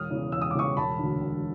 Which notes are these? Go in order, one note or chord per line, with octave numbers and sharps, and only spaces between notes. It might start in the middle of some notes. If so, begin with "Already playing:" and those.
Already playing: E1 D#6 F6
E2 C#3 E3
E1 E6
D#6
D6
E2 C#3 E3 C#6 D#6
E1 A5 B5
D2 D3
E1